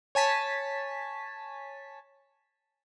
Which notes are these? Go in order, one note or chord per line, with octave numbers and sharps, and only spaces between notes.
C#5 G#5 A5 B6